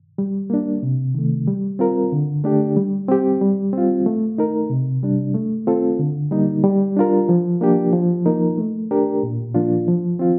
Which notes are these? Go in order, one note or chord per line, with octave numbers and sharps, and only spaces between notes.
G3
A#3 D4
C3
D#3 A3
G3
C4 F4 A#4
D3
A3 D4 G4
G3
C4 G4
G3
C4 F4
A3
D#4 A#4
C3
G3 D4
A3
C4 F4 A4
D3
G3 A#3 D#4
G3
D4 F4 A#4
F3
A#3 D4 G4
F3
A#3 D#4 A#4
A3
D4 G4 A#4
A#2
F3 A#3 D4 F4
F3
C4 F4